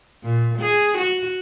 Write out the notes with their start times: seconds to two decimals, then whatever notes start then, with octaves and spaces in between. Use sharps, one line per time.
0.23 A#2
0.59 G#4
0.98 F#4